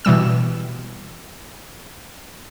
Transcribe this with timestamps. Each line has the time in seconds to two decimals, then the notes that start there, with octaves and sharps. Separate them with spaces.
0.05 B2 E3 G3 E6